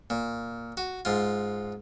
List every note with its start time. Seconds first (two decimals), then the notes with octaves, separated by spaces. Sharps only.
0.10 A#2
0.77 F#4
1.05 G#2 F4